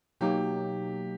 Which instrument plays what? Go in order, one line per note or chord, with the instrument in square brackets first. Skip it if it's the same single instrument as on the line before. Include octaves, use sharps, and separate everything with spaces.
[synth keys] B2 F#3 A#3 D#4 [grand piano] G4